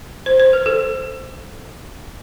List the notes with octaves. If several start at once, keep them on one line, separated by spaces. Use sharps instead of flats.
C5
C5
B4
A4